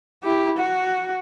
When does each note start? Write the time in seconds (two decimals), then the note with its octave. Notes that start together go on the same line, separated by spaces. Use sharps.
0.24 E4 G4
0.57 F#4